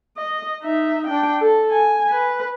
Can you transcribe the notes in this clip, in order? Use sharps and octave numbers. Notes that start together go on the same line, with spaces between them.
D#5
D#4 E5
D4 G5
A4
G#5
B4